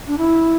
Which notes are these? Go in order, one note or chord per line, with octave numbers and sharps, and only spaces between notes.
D4
E4